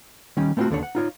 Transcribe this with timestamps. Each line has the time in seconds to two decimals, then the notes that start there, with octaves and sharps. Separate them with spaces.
0.37 D#3 G3 C#4
0.57 A3 B3 C4 D#4 F4 F#4
0.70 D#2 D3 D4 C#5
0.83 F#5
0.95 D#4 F4 C#5